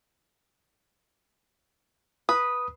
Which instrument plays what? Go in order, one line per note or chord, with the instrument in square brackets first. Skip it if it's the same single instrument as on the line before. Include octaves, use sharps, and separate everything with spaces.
[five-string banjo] B4 [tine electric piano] D#6